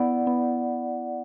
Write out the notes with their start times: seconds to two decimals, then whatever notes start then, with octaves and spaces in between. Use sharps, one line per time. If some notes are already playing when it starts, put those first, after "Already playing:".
Already playing: B3 E4 D5 F#5
0.27 B3